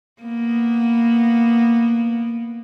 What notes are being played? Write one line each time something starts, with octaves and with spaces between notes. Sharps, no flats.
A#3 B3